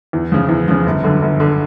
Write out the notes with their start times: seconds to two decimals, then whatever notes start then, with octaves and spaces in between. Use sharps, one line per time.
0.13 E2
0.32 C#3 F3
0.49 E2
0.68 C#3 F3
0.86 G1
1.04 F#2 D3
1.22 G1
1.40 D3